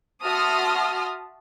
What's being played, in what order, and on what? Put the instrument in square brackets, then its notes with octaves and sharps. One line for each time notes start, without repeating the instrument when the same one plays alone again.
[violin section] F#4 E5 A5 C6 D#6 F6